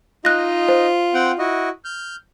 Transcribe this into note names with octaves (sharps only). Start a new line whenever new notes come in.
D#4 F4 D#5 F#6 A#6
C5
C4 F#5 G5
E4 F#4 D#5
F6 G6